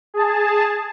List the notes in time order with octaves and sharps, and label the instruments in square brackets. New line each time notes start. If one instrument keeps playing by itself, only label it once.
[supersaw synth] G#4 A5